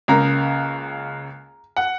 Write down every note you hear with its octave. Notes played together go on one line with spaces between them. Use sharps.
C#2 C#3 A#3 A#5
F#5